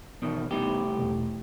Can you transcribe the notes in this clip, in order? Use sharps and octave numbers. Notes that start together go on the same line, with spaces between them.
E2 B2 D#3
C2 A2 B3 D#4 G4
E2 B2 A3